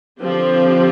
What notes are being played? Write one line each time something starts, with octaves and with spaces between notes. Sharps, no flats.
D3 F3 C4 G4